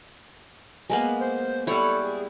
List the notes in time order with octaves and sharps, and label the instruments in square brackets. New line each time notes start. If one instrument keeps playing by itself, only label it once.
[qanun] G#3 A#3 B3
[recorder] C5
[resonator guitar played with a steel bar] G3 E4 [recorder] A4 [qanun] C#5 F#5
[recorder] G#4